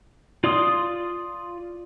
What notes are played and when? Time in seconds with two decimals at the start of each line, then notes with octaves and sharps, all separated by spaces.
0.44 F4 D5 C6 D#6